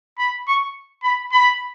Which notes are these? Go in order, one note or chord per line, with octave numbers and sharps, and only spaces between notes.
B5
C#6
B5
B5